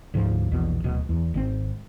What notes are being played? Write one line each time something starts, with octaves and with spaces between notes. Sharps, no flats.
D2 G#2 F3
A#1 E2 B2
D1 B2
E2
G#1 D#3 C4